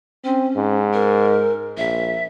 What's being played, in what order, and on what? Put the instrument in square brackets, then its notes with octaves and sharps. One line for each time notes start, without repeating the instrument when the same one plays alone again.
[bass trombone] C4 [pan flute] C#4
[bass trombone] G#2
[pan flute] A#4
[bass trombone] A#1 [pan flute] E5